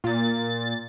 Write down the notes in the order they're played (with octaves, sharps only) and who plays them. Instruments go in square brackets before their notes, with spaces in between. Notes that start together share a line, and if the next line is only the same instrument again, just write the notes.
[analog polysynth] A#2 A6